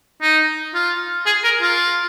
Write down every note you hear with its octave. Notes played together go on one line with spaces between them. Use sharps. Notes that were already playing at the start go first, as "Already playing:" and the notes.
D#4
F4
G#4
A#4
F4